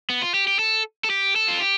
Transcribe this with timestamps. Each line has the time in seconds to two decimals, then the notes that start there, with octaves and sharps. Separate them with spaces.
0.10 B3
0.22 F4
0.34 G4
0.47 G4
0.59 A4
1.04 A4
1.10 G4
1.36 A4
1.48 F4
1.60 G4